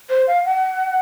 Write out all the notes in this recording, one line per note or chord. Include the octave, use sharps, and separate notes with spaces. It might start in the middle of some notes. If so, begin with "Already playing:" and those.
C5
F5
F#5